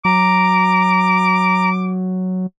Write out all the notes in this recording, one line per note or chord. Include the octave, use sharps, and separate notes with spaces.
F#3 A#5 D6